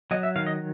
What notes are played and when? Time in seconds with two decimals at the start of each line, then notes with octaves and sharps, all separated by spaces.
0.11 F#3 D#5
0.23 E5
0.36 D#3 F5
0.47 D#5